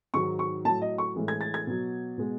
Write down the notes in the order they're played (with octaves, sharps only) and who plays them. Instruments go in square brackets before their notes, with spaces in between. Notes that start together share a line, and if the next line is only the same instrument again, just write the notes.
[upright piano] G#2 D#3 F#3 C#6
C#6
A2 F#3 A5
D#5
C#6
A2 E3 G#3
G#6
A6
G#6
B2 F#3
B2 G#3